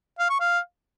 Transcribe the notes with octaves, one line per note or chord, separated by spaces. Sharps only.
F5
C#6
F5